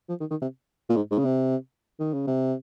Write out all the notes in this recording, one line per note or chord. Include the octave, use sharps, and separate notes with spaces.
F3
D#3
D#3
C3
A#2
G#2
G#2
C#3
C3
D#3
C#3
C3